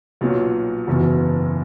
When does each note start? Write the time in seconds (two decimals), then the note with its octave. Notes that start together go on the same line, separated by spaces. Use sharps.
0.21 B1 A#2 F#3
0.87 F#1 E2 B2